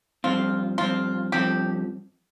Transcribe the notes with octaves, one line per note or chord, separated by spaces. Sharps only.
G2 F3 C4 F4
G2 F3 C4 F4
G2 F3 C4 G4